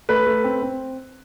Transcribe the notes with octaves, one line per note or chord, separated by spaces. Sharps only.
A3 B4
A3
C4
C4